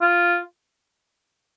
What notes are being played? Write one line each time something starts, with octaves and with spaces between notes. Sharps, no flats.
F4